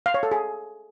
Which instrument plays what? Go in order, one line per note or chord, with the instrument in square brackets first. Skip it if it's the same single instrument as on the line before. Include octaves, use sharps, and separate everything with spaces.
[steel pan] F5
C#5
A4
G#4